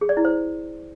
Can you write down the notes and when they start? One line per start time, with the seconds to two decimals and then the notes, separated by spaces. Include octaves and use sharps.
0.01 G#4
0.09 D5
0.17 E4
0.25 C5